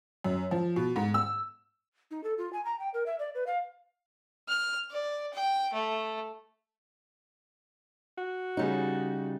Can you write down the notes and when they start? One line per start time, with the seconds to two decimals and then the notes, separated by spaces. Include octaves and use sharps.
0.24 F#2
0.51 F3
0.76 B2
0.96 G#2
1.14 E6
2.11 D#4
2.24 A4
2.38 F4
2.53 G#5
2.65 A#5
2.80 G5
2.94 A#4
3.06 E5
3.19 D5
3.35 B4
3.47 F5
4.49 F6
4.91 D5
5.33 G5
5.73 A3
8.18 F#4
8.57 C#3 G3 D#4